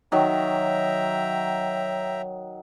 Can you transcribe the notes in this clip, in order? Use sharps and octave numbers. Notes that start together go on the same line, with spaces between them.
D#3 F#3 E5 G5 A#5